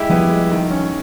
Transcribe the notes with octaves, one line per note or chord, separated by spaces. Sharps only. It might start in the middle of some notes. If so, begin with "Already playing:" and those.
Already playing: G#3 E4 G4
F3 G3 B3
G#3
D#3
C#4